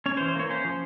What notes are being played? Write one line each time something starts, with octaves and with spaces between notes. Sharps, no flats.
C#4 C#5
C5
E3
C5
A#3 C#5
C#4 C5
F3